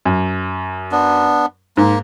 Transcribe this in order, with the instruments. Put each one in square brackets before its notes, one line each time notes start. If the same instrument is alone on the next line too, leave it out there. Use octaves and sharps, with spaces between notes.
[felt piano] F#2
[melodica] B3 D4
[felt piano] G#2 [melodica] A#3